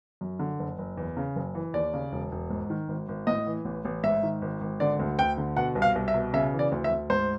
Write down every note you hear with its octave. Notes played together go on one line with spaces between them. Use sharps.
F#2
D3
F#1
F#1
E2
C#3
F#1
E3
D#2 D5
C#3
E1
E1
G#2
D#3
G#1
G#1
A2 D#5
E3
A1
A1
G#2 E5
D#3
G#1
G#1
D3 D5
D2
D2 G5
D3
B2 F#5
C2
F5
C2
E5
B2
C#3 E5
E3
D5
D2
E5
D2
G#2 C5